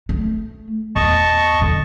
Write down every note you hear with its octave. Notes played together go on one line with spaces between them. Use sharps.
A3
E2 D#5 A5 C#6
D3